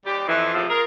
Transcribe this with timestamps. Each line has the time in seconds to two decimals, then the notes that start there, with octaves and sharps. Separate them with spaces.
0.06 D#2 G3 G4
0.27 F2 E3
0.54 E2 A2 C3 F3
0.70 F4 G#4 A#4